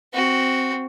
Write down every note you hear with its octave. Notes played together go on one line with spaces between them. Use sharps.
C4 F#4